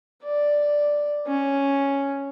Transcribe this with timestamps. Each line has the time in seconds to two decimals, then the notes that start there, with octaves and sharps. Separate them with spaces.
0.24 D5
1.27 C#4